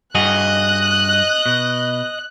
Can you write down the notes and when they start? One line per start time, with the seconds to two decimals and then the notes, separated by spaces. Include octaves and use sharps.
0.15 G2 F#4 G#4 D#5 F#6
1.46 B2